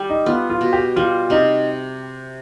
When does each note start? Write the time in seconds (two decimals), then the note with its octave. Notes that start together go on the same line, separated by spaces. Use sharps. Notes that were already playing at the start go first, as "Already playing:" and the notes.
Already playing: G3
0.10 D#4
0.26 B3 F4
0.50 F4
0.61 B2
0.73 G4
0.96 G3 F4
1.30 C3 D#4